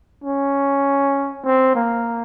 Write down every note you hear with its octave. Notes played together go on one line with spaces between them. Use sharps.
C#4
C4
A#3